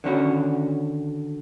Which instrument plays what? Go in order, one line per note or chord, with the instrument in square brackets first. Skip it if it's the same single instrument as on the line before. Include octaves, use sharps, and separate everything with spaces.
[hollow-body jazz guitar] D3 D#3 C#4 F#4